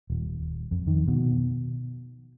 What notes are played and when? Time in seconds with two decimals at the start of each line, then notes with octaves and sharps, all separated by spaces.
0.10 D#1
0.71 F2
0.87 D#3
1.08 B2